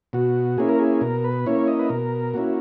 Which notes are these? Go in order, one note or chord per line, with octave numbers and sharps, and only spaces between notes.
B2 F#4
A#3 C#4 E4 G#4
A#4
G#4
B2 A#4
B4
A#3 C#4 E4 C#5
D#5
B4
B2 A#4
A#3 C#4 E4 F#4